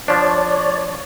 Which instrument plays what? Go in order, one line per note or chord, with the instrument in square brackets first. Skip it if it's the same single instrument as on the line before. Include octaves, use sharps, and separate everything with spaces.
[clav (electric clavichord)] F3 D4 [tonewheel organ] C#5 D5